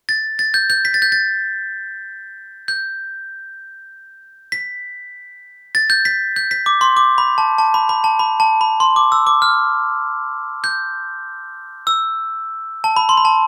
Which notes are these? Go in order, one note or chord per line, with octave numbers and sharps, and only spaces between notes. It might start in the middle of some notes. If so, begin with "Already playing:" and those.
A6
A6
G6
G6
B6
A6
G6
A6
G6
B6
A6
G6
B6
G6
B6
D6
C6
D6
B5
A5
A5
B5
B5
A5
B5
A5
B5
C6
D6
E6
D6
F6
G6
E6
A5
B5
C6
B5
A5